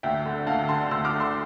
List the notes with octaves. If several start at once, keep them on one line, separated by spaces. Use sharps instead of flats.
D2 E5 G5
D3
D2 F5 A5
D3 A5 C6
D2 C6 E6
D6 F6
D3
C6 E6